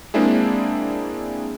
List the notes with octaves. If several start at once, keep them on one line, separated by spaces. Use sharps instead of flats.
G#3 A#3 C4 D4 E4 G#4